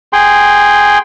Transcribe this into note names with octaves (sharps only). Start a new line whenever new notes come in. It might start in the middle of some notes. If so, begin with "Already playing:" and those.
G#4 G5 C6